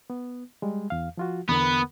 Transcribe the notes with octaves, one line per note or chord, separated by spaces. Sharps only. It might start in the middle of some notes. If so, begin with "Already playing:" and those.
B3
G3 G#3
E2 F5
F3 F4 F#4
E2 D3 B3 A#4